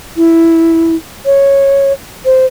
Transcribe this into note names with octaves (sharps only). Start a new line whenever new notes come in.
E4
C#5
C5